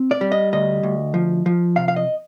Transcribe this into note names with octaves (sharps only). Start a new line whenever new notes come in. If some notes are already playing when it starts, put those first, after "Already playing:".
Already playing: C4
D5
G3
D#5
D2 D#5
D2
F3
F3
C3 F5
F5
D#5